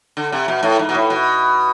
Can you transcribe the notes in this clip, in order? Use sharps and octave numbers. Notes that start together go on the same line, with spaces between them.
D3
C3
B2
A2
G#2
B2
A2
B2